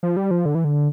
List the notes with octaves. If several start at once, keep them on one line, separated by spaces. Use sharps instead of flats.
F3
G3
F3
D3
E3
D3